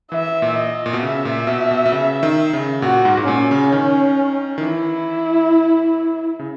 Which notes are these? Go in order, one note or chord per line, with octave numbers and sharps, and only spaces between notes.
E3 E5
A#2
D#5
A#2
B2
C#3 E5
A#2
B2
B2
B2
C#3
D#3
C#3
A#2 F#4
G#2
G#2
A#2 C#4
C#3
D#3
D#3
E3 E4
C#3